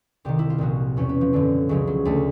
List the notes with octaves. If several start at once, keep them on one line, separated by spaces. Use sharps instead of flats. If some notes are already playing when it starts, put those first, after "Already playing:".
C2 C3 D#3 G4
E4
F4
C2 A#2 F3 F#4
E2 B2 C#4
B3
F3
F#2 D3 F3
C#2 C#3 F3 F#3
F#3
D2 D3 F3 A3